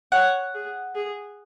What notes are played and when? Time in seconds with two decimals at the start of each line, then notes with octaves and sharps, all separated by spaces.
0.12 C#5 F#5
0.54 G#4
0.95 G#4